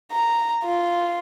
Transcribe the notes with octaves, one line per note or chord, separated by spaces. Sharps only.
A#5
F4